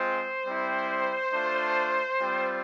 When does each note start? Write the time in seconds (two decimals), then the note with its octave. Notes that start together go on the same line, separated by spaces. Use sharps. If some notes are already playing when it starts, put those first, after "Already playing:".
Already playing: G#3 C4 F4 C5
0.45 G3 C4 E4
1.32 A3 D4 F4
2.19 G3 C4 F4